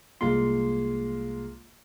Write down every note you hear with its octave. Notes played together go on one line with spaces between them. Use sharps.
C2 G#3 A#3 F4 C6